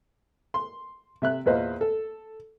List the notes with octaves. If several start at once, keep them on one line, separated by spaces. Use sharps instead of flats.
C6
C3 E5 F#6
E2 A#2 B4 C5 D#5 F5
A4